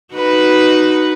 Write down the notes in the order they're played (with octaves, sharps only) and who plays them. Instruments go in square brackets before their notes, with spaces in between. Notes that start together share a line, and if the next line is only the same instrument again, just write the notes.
[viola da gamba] D#4 F#4 B4